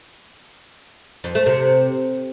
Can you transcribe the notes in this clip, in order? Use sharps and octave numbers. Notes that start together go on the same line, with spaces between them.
F2
A3
C3